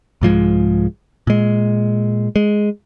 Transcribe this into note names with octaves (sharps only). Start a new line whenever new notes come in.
C2 G#2 F3 G#3
A#2 G#3
G#3